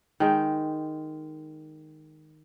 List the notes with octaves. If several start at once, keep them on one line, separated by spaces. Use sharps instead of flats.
D#3 G#3 G5